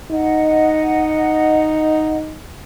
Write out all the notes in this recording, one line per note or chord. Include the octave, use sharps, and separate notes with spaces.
D#4 D#5 F#5